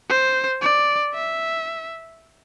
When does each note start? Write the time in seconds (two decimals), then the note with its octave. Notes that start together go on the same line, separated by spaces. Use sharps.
0.09 C5
0.62 D5
1.14 E5